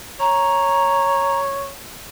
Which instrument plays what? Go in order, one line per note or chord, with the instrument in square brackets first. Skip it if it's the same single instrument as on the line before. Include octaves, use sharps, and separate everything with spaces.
[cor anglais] C#5 [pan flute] A#5